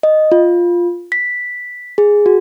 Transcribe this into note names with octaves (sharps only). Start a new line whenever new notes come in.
D#5
F4
B6
G#4
F#4